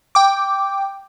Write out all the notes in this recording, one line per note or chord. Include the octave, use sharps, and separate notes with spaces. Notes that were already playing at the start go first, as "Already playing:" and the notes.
G5 D6